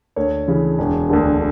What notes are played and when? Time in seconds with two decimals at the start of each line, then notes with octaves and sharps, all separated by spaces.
0.16 D2 C#5
0.48 C#3 E3
0.79 E1
1.10 D2 D3